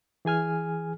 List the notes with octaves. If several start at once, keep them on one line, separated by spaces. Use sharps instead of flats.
E3 G#4 G#5 F6